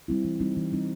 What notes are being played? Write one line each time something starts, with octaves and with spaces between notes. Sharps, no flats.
G3 C4 E4
E3
G3 C4 D#4
E3
G3 C4 D#4